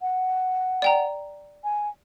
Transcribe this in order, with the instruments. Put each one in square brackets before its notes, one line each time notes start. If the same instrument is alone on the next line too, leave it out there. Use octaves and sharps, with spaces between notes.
[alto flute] F#5
[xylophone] D5 G5 A#5
[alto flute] G#5